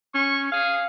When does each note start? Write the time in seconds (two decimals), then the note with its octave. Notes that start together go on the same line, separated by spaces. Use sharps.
0.15 C#4 C#6
0.52 G#4 F5